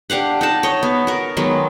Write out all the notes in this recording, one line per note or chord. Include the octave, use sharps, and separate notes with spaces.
D4 G4 F5 F#5
D#4 F#5 A5
C#5 D#5
B3
F#4 A#4
D#3 F#3 G#3 B3